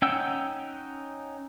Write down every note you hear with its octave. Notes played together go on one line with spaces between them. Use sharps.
C#4 D#4 F#5 G5 E6